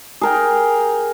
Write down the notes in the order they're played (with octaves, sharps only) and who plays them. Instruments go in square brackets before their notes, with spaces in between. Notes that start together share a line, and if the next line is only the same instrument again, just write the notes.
[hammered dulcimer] G#4 A#4 G5